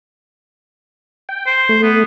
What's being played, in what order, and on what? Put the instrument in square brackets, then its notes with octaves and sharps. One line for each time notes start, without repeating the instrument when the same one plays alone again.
[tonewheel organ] G5
[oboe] C5
[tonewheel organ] A3
[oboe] B3